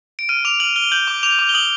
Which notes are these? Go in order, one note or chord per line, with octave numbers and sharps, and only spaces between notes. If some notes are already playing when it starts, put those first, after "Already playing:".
D7
F6 D#7
D6 F7
F6 F#7
F6 G7
G6 F#7
D6
D6 F7
D6
G7
D#6 F#7